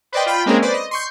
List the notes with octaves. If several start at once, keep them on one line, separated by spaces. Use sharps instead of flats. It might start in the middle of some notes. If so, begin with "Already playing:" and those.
B4 C5 D5 D#5 G5
F4 G5 B5
G#3 A#3 C4 C#4 G#4 A#4
B4 C5 D5
D#5
C6 C#6 G6